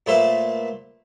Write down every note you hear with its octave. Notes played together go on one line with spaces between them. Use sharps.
A#2 A3 B4 C5 E5